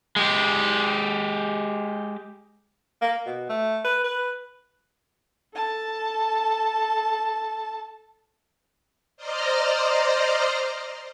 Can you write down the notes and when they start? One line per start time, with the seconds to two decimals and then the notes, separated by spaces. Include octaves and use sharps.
0.16 G#3 G4
3.02 A#3
3.26 B2
3.49 A3
3.84 B4
4.04 B4
5.55 A4 A5
9.17 C5 D5 D#5 A#5 C6 F6